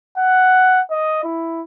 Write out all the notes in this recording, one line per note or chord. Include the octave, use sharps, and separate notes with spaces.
F#5
D#5
E4